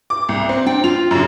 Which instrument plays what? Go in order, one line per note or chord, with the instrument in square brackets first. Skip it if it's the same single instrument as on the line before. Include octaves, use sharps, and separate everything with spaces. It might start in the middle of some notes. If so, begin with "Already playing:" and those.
[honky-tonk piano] D6
C2
C4
[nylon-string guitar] D4 G5
[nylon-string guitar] F4 [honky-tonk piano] F7
[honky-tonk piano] F#2 C#3